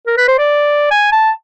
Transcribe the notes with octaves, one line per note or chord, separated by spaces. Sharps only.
A#4
B4
C5
D5
G#5
A5